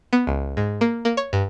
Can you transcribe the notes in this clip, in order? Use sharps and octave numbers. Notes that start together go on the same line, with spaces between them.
B3
C#2
G#2
A#3
A#3
C#5
G2